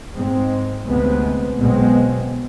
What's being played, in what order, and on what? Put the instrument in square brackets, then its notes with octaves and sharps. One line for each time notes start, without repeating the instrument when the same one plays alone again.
[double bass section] G#2 G#3 C4
D2 C3 G#3 B3
B1 B2 G#3 C4